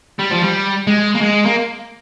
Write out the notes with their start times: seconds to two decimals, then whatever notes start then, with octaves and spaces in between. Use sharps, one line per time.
0.19 G3
0.31 F3
0.42 G3
0.87 G#3
1.15 A#3
1.21 G#3
1.45 A#3